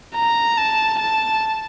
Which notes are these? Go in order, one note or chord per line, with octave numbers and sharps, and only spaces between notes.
A#5
A5
A5